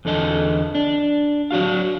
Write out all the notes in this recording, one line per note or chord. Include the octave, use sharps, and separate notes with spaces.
E2 D3 A4 D#5 A5
D4
F#3 D4 F#4 F5